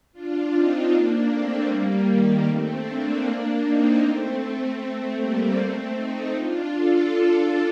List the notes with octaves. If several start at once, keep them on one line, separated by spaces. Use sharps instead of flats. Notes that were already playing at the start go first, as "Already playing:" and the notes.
D4 F4
C4 D#4
A#3 D4
A3 C4
G3 A#3
D#3 G3
A3 C4
A#3 D4
C4 D#4
A3 C4
A3 C4
A3 C4
G3 A#3
A3 C4
C4 D#4
D4 F4
F4 A4